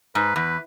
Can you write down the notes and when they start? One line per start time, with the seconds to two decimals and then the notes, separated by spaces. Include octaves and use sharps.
0.15 G#2 B4
0.36 E2 B4